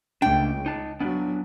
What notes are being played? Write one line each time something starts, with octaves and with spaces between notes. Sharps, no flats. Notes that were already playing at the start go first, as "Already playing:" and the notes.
C#2 C#3 A3 D4 G5
D#4 A5
F#3 B3 D4